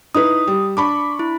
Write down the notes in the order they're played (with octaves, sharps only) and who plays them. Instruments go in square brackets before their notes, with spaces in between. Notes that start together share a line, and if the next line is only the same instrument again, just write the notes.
[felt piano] D#4 E4 B4 [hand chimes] D#6
[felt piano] G3
[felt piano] D4 B5 C#6 [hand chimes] D6
[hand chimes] E4